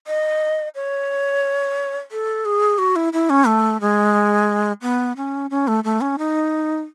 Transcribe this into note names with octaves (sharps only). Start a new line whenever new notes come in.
D#5
C#5
A4
G#4
F#4
E4
E4
C#4
A3
G#3
B3
C#4
C#4
A3
A3
C#4
D#4